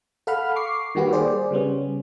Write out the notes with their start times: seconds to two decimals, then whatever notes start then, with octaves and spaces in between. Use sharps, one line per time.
0.27 A4 F5 F#5 B5 F6
0.56 C#6 D6 C7
0.95 D#3 G3 A#3 F#4 G4 B4
1.13 G#4 C5 D5
1.51 C#3 G3 B3 C#4